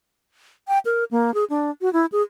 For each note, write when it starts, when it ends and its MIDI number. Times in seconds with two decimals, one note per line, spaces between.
0.68 0.79 79
0.85 1.04 70
1.11 1.34 58
1.34 1.44 68
1.50 1.71 62
1.81 1.92 66
1.93 2.06 64
2.12 2.22 68